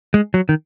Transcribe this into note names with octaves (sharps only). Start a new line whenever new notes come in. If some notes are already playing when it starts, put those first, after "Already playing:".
G#3
F#3
D#3